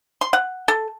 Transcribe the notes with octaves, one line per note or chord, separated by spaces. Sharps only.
C6
F#5
A4